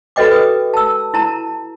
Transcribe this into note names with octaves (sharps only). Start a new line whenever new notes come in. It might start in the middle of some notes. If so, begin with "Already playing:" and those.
F#4 A4 B4 D#5 G5 D6
B4 D#6
A5 E6
E4 A5 A#5